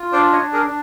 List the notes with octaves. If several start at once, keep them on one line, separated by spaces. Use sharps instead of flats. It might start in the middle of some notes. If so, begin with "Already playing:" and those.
Already playing: F4
D4 C5 D5
C#5 D#5
D4
G#4 A#4
D4